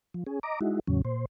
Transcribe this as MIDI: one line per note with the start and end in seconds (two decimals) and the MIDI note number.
0.14 0.24 53
0.27 0.39 61
0.27 0.39 68
0.43 0.59 75
0.43 0.59 82
0.43 0.59 86
0.61 0.80 56
0.61 0.80 63
0.61 0.80 64
0.61 0.80 66
0.87 1.02 40
0.87 1.02 45
0.87 1.02 49
0.87 1.02 54
0.87 1.02 61
1.05 1.25 46
1.05 1.25 72